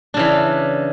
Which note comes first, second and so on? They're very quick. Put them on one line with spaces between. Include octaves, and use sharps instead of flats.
D4 C#3 E3